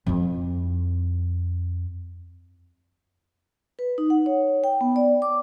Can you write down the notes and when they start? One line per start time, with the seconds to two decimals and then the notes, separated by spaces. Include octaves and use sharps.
0.06 F2 E4
3.79 B4
3.98 D#4
4.10 F#5
4.26 C#5
4.64 G5
4.81 B3
4.96 D5
5.22 D6